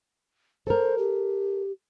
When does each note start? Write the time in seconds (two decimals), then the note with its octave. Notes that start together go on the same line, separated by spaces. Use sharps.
0.67 A4 A#4 C5
0.98 G4